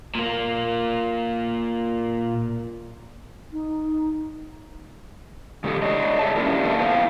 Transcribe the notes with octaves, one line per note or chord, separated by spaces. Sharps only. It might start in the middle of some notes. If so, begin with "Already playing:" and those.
A#2 A#3
D#4
C#3 G#3 G4 A4
D4 C#5 D#5
G#4 E5 A5
A#3 C#4 D4 E4 G4 A#4
A4 B4 E5 F5 A5
B3 E4 C5 F5 G5